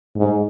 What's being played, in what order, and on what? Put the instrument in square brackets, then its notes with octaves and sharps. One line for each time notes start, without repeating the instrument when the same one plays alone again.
[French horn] G#2